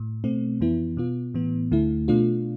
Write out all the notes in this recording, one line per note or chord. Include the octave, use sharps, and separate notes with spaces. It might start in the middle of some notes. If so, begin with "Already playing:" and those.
Already playing: A2
B2 A3 C4
F2 E3 B3 E4
B2 B3 F4
A2 E3 B3
D2 D3 A3 E4
B2 A3 D4 F4